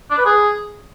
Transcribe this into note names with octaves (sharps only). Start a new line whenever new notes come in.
D4
B4
G#4